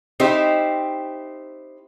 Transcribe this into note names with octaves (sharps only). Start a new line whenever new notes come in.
C4 D#4 E4 G4 C5